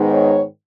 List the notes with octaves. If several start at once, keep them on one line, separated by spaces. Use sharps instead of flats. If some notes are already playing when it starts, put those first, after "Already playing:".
Already playing: G#2 D#3 G#3 B3 D#4
C#5